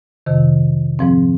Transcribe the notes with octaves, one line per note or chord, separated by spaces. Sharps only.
F2 C3 D#3
G#2 F3 C4